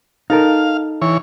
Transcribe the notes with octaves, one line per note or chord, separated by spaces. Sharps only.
D#4 A4 A#4 F5
E3 C#5